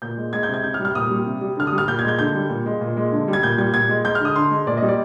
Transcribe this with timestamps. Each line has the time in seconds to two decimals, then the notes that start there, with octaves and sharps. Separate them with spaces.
0.02 A#2 G6
0.17 G#3
0.33 G#3 G#6
0.43 G6
0.49 C3 G#6
0.64 C3 G6
0.74 F6
0.80 G3
0.85 F6
0.95 A#2 D#6
1.10 G3
1.26 C3
1.41 G3
1.57 D3 F6
1.67 D#6
1.72 G3
1.78 F6
1.88 A#2 G6
1.99 G#6
2.03 G#3 G6
2.19 D3 G6
2.35 G3
2.50 A#2
2.66 G#3
2.81 A#2
2.97 G#3
3.12 D3
3.28 G3
3.33 G#6
3.43 A#2 G6
3.58 G3 G#6
3.74 A#2 G#6
3.89 G#3
4.05 G#3 G6
4.15 F6
4.20 D3 D#6
4.36 D3 C6
4.51 G#3
4.67 A#2 D5
4.77 D#5
4.82 G3
4.89 D5